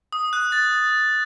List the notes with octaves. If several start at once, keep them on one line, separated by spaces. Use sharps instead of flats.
D#6
F#6
A6